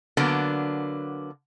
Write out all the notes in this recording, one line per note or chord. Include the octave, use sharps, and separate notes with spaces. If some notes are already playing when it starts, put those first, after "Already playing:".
D3 F#3 A#3 B3 D4